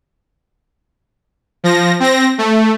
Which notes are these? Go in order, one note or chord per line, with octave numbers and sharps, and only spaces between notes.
F3 A#6
C4 A#6
A3